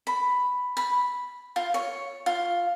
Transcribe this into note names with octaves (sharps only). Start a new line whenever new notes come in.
B5
B5
F4
C#5
F4